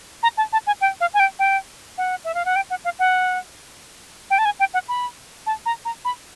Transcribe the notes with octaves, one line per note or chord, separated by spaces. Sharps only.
A#5
A5
A5
G#5
G5
F5
G#5
G5
G5
F#5
E5
F5
F#5
G5
F#5
F5
F#5
G5
A5
G#5
G5
F#5
B5
A5
A#5
A#5
B5